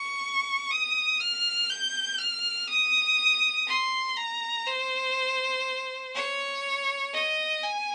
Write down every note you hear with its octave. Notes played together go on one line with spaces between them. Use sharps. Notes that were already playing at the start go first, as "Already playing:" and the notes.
Already playing: C#6
D#6
F6
G6
F6
D#6
C6
A#5
C5
C#5
D#5
G#5